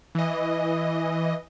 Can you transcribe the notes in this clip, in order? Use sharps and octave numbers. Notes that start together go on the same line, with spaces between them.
E3 D#5